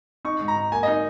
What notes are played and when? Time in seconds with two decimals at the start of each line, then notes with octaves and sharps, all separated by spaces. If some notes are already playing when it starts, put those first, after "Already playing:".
0.25 D#4 C#6
0.40 G#2
0.48 A#5
0.56 G#2
0.72 A#3 G#5
0.83 D#5
0.87 D#4